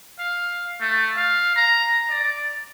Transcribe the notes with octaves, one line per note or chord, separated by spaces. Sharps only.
F5
A3
F5
A#5
D5